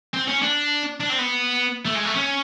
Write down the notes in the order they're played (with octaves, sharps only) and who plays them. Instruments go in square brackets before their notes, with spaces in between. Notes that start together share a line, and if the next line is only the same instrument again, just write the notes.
[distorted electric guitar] C4
C#4
D4
D4
C4
B3
A3
G#3
A3
C#4